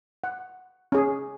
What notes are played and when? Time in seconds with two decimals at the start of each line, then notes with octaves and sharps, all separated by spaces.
0.24 F#5
0.92 C#4 G#4